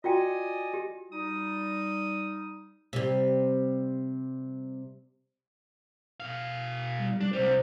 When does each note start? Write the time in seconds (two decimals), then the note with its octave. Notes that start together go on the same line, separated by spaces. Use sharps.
0.04 F4 F#4 D5 D#5 G5 G#5
0.74 G4
1.12 G3 D#4 D#6
2.93 C3 G3
6.20 B2 F5
6.98 G3
7.21 G3 D4
7.33 C3 G3 C5